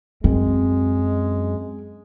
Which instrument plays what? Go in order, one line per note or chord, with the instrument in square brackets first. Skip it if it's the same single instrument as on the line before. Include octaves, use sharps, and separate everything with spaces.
[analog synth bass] F#2 [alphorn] G#3 [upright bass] C4